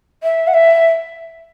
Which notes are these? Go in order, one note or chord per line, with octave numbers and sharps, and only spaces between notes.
E5
F#5
E5